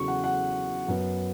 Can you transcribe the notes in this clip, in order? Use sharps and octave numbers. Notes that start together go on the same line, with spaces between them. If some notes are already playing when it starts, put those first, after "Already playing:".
Already playing: E2 C#3 F#3 C#6
F#5
F#5
F#2 F#3 B3